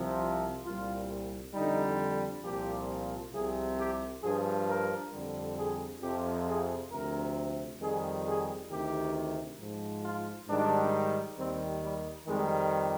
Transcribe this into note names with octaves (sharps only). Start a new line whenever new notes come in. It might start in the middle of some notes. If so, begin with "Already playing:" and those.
Already playing: C2 C3 F3
F4
C2 A#2 G3 F4
F2 D3 G3 D#4
C2 A#2 F3 G4
C2 C3 F3 G#4
G4
G2 F3 G#4
A#4
F2 D3 G3
G#4
F2 C3 F3 G4
G#4
D2 C3 F3 A#4
F2 D#3 G3 G#4
G#4
D2 C3 D#3 G4
G#2 F3
F4
G#2 D#3 G3 D4
D#2 D#3 G3 C4
G3
F2 D#3 G3 G#3